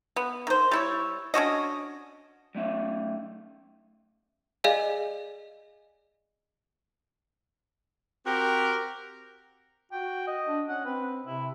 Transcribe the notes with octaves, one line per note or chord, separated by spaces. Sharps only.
B3
D#3 C5
G3 E4 C#5
C#4 D4 F#4 D#5
F#3 A3 C#4 E5
G#4 D5 D#5 F5 G#5
C4 F#4 G4 A#4
F#4 G5
D#5
D4
C#4 F#5
C4 B4
C3 E4